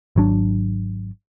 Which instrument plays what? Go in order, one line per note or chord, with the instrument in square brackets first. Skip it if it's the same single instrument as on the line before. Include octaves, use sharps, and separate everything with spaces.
[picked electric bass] G#1 F#3 D4